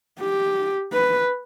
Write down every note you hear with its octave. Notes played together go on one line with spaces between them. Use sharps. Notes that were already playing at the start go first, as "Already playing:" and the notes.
G4
B4